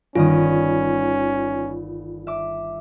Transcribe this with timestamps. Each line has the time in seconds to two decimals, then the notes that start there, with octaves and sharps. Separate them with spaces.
0.16 G1 D#3 C#4 F4 D#6
2.27 E5 D6